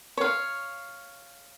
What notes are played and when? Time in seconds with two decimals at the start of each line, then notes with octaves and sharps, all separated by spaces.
0.17 C#5 F5